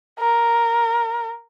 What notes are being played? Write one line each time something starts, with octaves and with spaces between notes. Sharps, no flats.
A#4